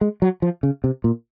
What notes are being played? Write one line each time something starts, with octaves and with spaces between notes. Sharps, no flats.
G#3
F#3
F3
C#3
C3
A#2